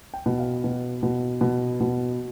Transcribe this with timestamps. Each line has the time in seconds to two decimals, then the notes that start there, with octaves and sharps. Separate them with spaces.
0.14 G5
0.26 B2
0.40 F5
0.64 B2
1.03 B2
1.41 B2
1.81 B2